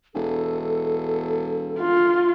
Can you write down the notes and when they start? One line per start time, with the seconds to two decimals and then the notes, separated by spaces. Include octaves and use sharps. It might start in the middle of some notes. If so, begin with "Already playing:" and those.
0.15 E1 A4
1.79 F4